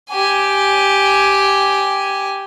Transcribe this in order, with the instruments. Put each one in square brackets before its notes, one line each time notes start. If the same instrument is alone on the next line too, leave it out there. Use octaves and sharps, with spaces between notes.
[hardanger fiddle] G4 G#5